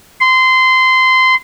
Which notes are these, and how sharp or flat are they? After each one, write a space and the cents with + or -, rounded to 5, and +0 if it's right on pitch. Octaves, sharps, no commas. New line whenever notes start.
C6 -20